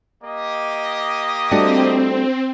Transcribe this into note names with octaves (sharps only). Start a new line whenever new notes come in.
A#3 G4 D#5
G3 A3 C4 D4 F#4